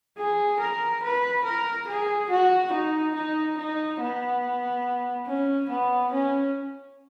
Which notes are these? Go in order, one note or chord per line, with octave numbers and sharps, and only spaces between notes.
G#4
A#4
B4
A#4
G#4
F#4
D#4
D#4
D#4
B3
C#4
B3
C#4